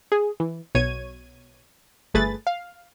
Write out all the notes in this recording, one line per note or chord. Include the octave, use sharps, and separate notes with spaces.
G#4
E3
B1 B2 C#5 G#6 D#7
G1 A3 G#4 B4 A6
F5